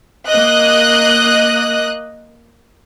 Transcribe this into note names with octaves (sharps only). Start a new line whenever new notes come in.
A#3 D#5 D#6 F#6